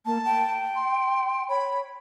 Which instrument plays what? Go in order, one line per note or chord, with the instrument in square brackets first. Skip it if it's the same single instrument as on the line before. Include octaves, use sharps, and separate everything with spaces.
[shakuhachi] A#3 [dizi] A5
[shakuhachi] G5
[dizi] C6
[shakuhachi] C#5 [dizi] B5